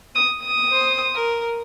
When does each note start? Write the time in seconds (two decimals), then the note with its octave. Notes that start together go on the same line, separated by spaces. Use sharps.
0.15 D#6
0.43 D#6
0.71 C5
1.14 A#4